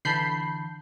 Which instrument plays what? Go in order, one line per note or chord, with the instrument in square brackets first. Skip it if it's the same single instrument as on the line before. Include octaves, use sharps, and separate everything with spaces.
[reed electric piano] D3 E3 A5 [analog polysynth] B5 G6 C7